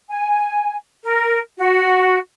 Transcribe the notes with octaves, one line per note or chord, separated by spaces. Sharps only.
G#5
A#4
F#4